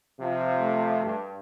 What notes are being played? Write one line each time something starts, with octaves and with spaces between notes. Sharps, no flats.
C3 F3
A3
G2